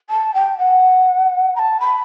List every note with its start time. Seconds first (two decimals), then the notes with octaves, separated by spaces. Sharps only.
0.09 A5
0.34 G5
0.58 F#5
1.55 B5
1.59 A5
1.80 B5